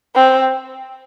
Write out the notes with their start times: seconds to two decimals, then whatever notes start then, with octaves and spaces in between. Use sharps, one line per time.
0.15 C4